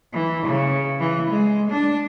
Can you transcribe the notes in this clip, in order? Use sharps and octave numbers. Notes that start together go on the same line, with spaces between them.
E3
C#3
E3
G#3
D4